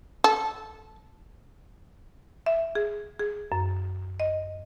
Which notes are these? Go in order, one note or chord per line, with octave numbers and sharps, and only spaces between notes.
A4
E5
G#4
G#4
F#2
D#5